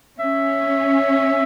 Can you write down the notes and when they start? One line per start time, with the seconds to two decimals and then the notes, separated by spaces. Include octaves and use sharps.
0.20 C#4 E5